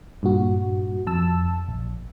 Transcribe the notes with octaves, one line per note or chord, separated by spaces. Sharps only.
G2 A#2 F#4
F2 A5 E6
A#1